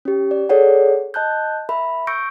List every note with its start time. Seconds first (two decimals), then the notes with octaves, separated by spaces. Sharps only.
0.05 C#4 G4
0.31 D5
0.49 G#4 A4 C#5 D5 F#5
1.14 D#5 A5 F#6 G6
1.69 A#4 E5 B5
2.07 C#6 E6 G6 A#6 C#7 D7